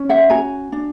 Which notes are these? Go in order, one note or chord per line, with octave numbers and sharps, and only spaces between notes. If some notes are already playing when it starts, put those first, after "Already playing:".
Already playing: C#4
E5 F#5
F#4 G#5 A#5
D4